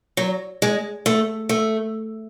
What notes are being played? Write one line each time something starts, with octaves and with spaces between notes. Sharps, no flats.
F#3
G#3
A3
A3